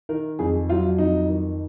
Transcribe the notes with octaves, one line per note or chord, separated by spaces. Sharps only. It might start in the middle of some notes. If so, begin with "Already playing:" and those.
D#3 A#4
F2 G#4
F#3 F4
F2 D#4
D#3